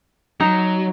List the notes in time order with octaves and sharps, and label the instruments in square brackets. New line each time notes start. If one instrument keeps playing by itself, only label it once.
[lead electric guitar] F#3 [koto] D#4